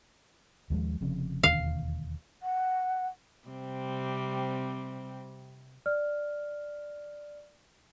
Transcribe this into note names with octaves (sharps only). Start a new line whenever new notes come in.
D#2 F3 G#3
F1 F2 C#3
E1 D#2 D3 F5
F#5
C3 G3 C4
D5 F6